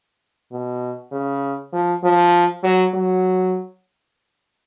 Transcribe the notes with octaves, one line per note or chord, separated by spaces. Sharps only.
B2
C#3
F3
F3
F#3
F#3